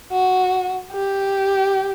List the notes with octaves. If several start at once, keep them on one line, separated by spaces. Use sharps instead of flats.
F#4
G4